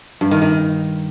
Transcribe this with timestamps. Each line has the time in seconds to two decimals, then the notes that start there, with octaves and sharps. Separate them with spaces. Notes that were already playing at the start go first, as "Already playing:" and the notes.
0.21 G2
0.31 D#3
0.42 D#3